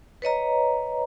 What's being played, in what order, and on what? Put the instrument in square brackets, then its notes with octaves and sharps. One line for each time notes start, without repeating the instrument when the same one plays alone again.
[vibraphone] B4 C#5 D#5 A#5